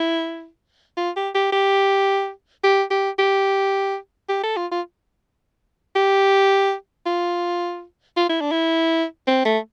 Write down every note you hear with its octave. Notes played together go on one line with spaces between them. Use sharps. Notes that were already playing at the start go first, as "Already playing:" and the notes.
Already playing: E4
F4
G4
G4
G4
G4
G4
G4
G4
A4
F4
F4
G4
F4
F4
E4
D4
E4
C4
A3